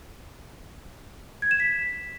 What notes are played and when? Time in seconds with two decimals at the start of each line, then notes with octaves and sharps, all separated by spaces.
1.42 G#6
1.51 E7
1.60 B6